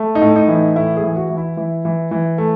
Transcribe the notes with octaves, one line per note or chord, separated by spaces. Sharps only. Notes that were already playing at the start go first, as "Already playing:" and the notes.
Already playing: A3
D#4
A2
D#4
E3
D#4
A2 E4
G#4
E3
F#4
E3
E4
E3
E3
E3
A3